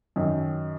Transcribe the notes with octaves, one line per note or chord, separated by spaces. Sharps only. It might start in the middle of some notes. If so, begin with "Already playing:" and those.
F#2 D#3 F#3